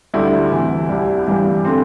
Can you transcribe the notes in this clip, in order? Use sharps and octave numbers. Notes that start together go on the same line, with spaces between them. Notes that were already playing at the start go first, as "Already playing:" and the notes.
D2 D3 G3 E4
D2 C3 E3
C2 C3 G3
G2 E3 G3
D3 C4